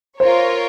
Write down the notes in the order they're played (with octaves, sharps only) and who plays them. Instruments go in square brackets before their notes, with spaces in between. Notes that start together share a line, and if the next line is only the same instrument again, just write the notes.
[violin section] F4 A#4 C#5 [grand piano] C5